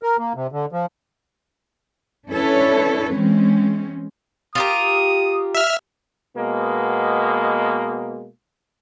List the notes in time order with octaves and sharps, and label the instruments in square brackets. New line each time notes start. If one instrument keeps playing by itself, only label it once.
[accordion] A#4
A#3
C3
D3
F3
[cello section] C#4 D4 E4 A4 B4 C#5
E3 G#3 C4 C#4
[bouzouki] F4 G4 A#4 [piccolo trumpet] D#6
[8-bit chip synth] E5 F6
[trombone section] B2 G#3 A#3 B3